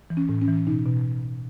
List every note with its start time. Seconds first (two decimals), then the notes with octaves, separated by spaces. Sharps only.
0.10 E3
0.17 C#4
0.29 A2
0.41 C#4
0.48 E3
0.67 B2 D#4
0.86 B2